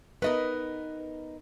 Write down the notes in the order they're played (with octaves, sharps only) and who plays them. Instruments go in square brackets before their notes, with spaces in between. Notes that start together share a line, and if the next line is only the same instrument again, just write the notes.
[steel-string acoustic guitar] B3 D#4 A#4 [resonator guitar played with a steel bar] B4 D#5